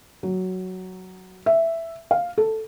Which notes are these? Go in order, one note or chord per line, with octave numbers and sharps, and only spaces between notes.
F#3
E5
F5
A4